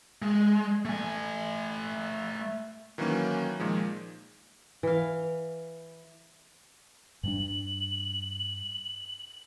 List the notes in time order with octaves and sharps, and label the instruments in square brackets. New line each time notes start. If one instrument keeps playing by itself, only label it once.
[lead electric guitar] G#3
A3 G#5
[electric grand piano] D#3 E3 F#3 A#3 C#4
A#2 D#3 F3 G#3
[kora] E3 F5
[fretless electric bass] G2 G3 D4 [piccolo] F#7